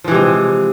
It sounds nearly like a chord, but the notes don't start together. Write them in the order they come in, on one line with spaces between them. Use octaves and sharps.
F3 E3 C3 G#3